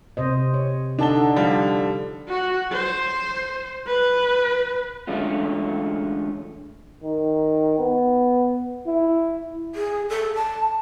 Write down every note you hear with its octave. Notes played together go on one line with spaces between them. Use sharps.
C3 C5 D#5
C#5
D3 D4 D#4 A5 G7
F3 G3 F5
F#4
C5
B4
D3 E3 G#3 A3 C#4 F4
D#3
B3
E4
G#4
A4
A5